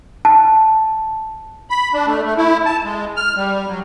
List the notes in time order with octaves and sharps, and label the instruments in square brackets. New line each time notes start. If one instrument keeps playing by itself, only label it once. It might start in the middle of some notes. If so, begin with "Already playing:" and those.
[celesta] A5
[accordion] B5
D4
A3
A3
E4
A5
G#3
F6
G3
F#3